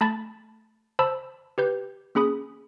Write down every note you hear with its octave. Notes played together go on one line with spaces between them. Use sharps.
A3 A5 B5 A6
C5 A5 B5 E6
G4 B4 G6
A#3 C#4 G#4 B5 D#6